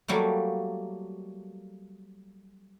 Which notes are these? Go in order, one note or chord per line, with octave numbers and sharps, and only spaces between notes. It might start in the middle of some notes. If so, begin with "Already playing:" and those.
F#3 G3 A3 A#3